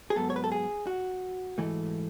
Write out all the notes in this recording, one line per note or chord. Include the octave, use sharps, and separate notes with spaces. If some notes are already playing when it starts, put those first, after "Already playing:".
G#4
G#2 F#3 B3 A4
C#5
B4
A4
G#4
F#4
G#2 E3 A3